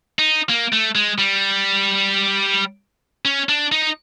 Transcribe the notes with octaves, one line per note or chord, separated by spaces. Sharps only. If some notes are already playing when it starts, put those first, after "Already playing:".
D#4
A#3
A3
G#3
G3
C#4
D4
D#4